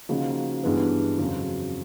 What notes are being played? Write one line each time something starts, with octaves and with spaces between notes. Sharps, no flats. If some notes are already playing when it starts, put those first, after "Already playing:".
C#3 F3 A#3 D#4 F#4
G2 E3 G#3 B3
F2 C#3 F#3